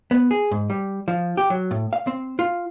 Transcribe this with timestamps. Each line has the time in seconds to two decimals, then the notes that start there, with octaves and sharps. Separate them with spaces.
0.11 B3
0.31 G#4
0.51 G#2
0.70 G3
1.08 F3
1.37 G4
1.50 F#3
1.71 A2
1.93 F5
2.07 C4
2.39 F4